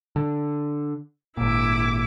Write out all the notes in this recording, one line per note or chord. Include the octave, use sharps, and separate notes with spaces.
D3
G#1 A#2 E4 D6